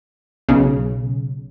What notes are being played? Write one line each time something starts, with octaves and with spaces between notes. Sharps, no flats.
B1 C#3